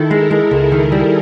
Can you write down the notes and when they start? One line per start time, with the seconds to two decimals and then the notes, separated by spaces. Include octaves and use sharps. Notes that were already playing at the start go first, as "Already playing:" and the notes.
Already playing: D#3 E4 A4
0.10 G#3 A#4
0.31 G#3
0.51 C#2 G#4
0.72 D#3
0.92 G3